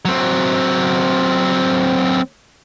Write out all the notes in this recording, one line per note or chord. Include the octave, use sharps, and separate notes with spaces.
F#3 C4